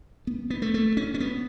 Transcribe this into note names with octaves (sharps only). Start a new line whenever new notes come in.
B3
B3
A3
A3
C#4
C#4
B3